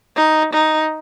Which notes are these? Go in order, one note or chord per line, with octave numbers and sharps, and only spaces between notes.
D#4
D#4